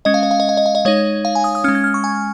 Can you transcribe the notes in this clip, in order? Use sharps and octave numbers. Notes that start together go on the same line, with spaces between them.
G#3 C#4 D#5
F5
D#5
F5
D#5
F5
D#5
F5
D#5
G#3 D#4 C#5
F5
G#5
D#6
D#6
G#3 C#4 F6
G#6
F6
C#6
G#5